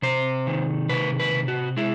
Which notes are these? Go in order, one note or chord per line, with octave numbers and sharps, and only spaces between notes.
C3 C5
D#3
C3 B4
B4
C3
F#4
G#3 E4